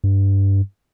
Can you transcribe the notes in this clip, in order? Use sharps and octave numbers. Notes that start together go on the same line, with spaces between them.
G2